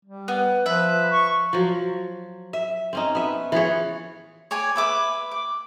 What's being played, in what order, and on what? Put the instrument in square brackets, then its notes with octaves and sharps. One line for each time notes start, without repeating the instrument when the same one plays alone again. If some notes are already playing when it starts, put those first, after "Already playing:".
[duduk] G3
[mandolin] B3
[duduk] F3 [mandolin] B4 E5
[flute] C#6
[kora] F3 F#3
E5
C4 C#4 D#4
B3 E5
E3 F3 G#4 C#5
[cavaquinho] C#5 D5 G#5
B4 E5 D6
D6